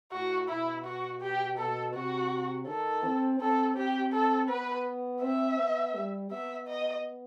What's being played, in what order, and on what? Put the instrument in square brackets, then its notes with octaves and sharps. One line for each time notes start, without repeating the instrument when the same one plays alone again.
[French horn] A2 [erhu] F#4
[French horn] B2 [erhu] E4
[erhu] F#4
G4
[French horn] B2 [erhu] A4
[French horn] C3 [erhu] F#4
[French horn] D#3 [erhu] A4
[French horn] C4
[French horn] C4 [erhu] A4
[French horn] C4 [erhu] G4
[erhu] A4
[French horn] B3 [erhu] B4
[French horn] C4 [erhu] E5
[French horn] B3
G3
[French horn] B3 [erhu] E5
[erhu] D#5